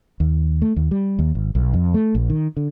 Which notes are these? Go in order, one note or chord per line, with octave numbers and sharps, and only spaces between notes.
D#2
A3
D#2
G3
D#2
G#1
B1
F2
A3
A#1
D#3
D3